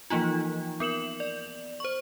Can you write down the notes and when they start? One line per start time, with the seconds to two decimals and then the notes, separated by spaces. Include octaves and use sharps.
0.10 E3 F3 A#3 D#4 F4
0.80 B3 A#4 E7 F#7
1.20 D5
1.80 C5 C#6